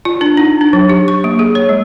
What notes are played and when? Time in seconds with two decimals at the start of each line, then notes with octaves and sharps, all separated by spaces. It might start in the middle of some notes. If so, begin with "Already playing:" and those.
0.05 F4
0.21 D4
0.37 D#4
0.61 D4
0.73 F#3
0.89 G4
1.08 C#6
1.24 A#3
1.39 G#4
1.55 C#5
1.69 G#3